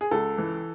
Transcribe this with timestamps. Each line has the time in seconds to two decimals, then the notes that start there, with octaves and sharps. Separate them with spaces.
0.01 G#4
0.11 C#2 A4
0.38 E3